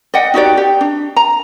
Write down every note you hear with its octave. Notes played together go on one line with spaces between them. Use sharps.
D5 D#5 F#5 G5
D#4 F#4 G4 D5
G4
D4
A#5